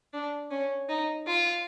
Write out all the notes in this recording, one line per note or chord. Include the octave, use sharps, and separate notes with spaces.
D4
C#4
D#4
F4